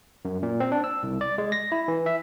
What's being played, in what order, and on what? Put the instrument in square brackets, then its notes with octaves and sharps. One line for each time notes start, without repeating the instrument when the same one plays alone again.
[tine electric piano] F#2
A#2
C4
D4
E6
C2
D5
G#3
A#6
E4
E3
E5